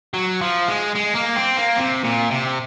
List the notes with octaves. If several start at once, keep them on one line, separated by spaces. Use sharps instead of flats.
F#3
F3
G#3
G#3
A#3
C4
A#3
C3
A#2
C3